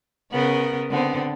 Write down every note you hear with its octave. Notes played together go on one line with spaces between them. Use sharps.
C#3 B3 A#4
D3 B3 C4